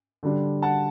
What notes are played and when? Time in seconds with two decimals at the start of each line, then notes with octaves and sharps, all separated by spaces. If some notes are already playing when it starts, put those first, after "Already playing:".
0.23 D3 G3 D4
0.62 F#5 A5